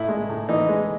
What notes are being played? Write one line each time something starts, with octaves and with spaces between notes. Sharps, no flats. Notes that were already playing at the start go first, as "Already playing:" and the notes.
Already playing: A2 E4
G#3
A2
E3 D#4
G#3